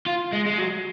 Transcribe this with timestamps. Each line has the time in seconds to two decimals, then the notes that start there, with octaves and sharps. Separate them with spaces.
0.06 F4
0.33 G#3
0.46 G#3
0.58 F#3